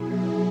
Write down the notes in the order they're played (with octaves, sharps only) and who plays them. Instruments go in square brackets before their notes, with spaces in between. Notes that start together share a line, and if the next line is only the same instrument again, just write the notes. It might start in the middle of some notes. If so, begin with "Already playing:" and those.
Already playing: [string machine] B2 F#3 E4 G#4